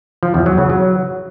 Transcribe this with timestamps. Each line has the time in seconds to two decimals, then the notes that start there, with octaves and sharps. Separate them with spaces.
0.23 F3
0.34 E2
0.46 F#3
0.58 C#3
0.70 F#3